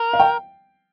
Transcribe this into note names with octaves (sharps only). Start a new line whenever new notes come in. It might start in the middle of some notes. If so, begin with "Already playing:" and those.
Already playing: A#4
F5
G5